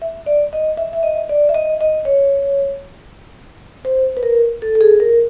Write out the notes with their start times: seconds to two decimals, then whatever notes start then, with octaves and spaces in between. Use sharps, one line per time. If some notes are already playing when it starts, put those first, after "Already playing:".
0.02 E5
0.26 D5
0.53 D#5
0.77 E5
0.93 E5
1.03 D#5
1.29 D5
1.49 E5
1.55 D#5
1.81 D#5
2.05 C#5
3.85 C5
4.17 B4
4.23 A#4
4.62 A4
4.75 A4
4.81 G#4
5.00 A#4